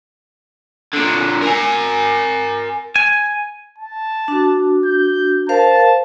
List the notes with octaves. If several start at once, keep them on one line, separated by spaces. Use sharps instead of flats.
A#2 D3
A#4 G#5
G#5
A5
D4 F#4
G6
A#4 C5 F5 A5